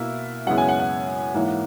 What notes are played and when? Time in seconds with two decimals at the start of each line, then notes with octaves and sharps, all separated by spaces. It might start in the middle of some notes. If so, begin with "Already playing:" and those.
Already playing: B2 A#3 E4
0.47 F#2 C#3 G#3 B3 E4 F#5
0.58 G#5
0.69 F#5
0.80 F#5
1.34 G#2 E3 A#3 E4